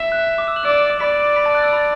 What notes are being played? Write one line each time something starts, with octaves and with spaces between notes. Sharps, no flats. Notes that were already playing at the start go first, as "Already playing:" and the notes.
Already playing: E5
F#6
D6
E6 E7
F#6 F#7
D5 E6 E7
D5 B5 B6
B5 B6
A5 A6
F#6
E6
B5